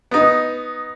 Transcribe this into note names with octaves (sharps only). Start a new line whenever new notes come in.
B3 D#4